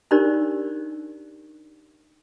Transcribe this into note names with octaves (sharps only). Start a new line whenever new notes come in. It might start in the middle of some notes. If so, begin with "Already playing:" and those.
D4 D#4 G4 A#4 C5 D5